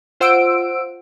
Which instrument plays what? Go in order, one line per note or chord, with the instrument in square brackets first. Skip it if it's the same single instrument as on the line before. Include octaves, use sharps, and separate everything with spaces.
[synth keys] F4 C5 F#5 E6 D7